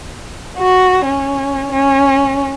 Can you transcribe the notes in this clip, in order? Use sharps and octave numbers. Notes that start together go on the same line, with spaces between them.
F#4
C#4
C#4